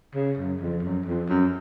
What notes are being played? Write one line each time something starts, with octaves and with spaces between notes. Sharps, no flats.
C#3
F#2
F2
F#2
F2
F#2